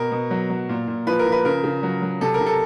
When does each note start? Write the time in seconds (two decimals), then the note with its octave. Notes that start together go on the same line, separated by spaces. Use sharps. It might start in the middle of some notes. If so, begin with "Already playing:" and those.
Already playing: B2 A#4
0.12 B2
0.31 F#3
0.50 F#3
0.69 A#2
0.88 A#2
1.07 F3 B4
1.19 A#4
1.26 F3
1.32 B4
1.45 C#3 A#4
1.64 C#3
1.83 F#3
2.02 F#3
2.21 C3 A4
2.34 A#4
2.40 C3
2.47 A4